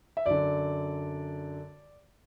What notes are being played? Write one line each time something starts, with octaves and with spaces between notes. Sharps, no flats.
E5
F#2 D3 D5